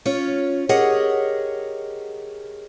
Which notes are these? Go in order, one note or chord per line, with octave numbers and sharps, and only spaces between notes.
C#4 F4 C#5
G4 G#4 A#4 C#5 D#5 F#5